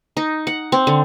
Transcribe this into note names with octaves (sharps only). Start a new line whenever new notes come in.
D#4
F#5
C4
D3